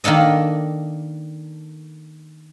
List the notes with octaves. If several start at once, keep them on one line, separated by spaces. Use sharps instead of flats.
D#3 A#3 D4 A4 D#5